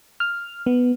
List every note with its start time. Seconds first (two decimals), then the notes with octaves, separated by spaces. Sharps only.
0.20 F6
0.66 B3